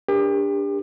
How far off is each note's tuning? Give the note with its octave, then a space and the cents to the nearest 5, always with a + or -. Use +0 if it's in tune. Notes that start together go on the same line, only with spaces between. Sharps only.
D4 -15 G4 +35 A#4 +25